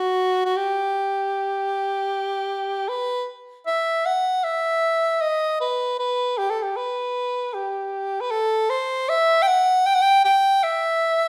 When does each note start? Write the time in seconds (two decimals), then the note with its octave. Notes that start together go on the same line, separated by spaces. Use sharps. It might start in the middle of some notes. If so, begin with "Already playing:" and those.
Already playing: F#4
0.45 F#4
0.57 G4
2.89 B4
3.67 E5
4.06 F#5
4.44 E5
5.21 D#5
5.61 B4
5.99 B4
6.38 G4
6.50 A4
6.63 G4
6.76 B4
7.54 G4
8.21 B4
8.31 A4
8.70 C5
9.09 E5
9.42 G5
9.47 F#5
9.86 G5
9.94 F#5
10.02 G5
10.25 G5
10.63 E5